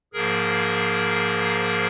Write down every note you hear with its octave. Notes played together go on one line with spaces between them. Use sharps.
G#2 F3 A#3 G#4 A#4